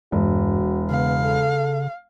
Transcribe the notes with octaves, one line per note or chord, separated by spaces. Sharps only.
E1 G2 F#4
C#3 B3 F5
A4